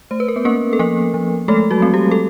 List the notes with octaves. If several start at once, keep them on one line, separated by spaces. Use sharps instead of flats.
A3 C5
B4
A#4
B3 B4
A#3 C#4 A#4
A4
F3 A#3 A#4
F3
G#3 A3 A4
F#3 F#4
C4
G3 G4
A4